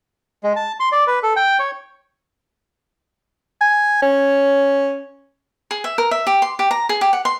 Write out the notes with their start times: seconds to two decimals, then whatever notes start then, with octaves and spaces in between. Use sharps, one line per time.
0.43 G#3
0.56 A5
0.80 C6
0.92 D5
1.07 B4
1.23 A4
1.36 G5
1.59 C#5
3.61 G#5
4.02 C#4
5.71 G#4
5.84 E5
5.98 A#4
6.11 E5
6.27 G4
6.42 C6
6.59 G4
6.71 A#5
6.89 G#4
7.01 G4
7.13 F#5
7.25 C6